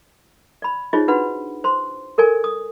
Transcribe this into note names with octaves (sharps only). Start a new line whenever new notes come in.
D5 B5
D#4 F4 G#4 C5 C#5 D#5
D4 F#4 B4 F#5 B5
C5 C6
A4 A#4 D5 G#5
D#6